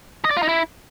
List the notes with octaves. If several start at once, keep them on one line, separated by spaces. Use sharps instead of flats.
D#5
D5
F4
D#4
E4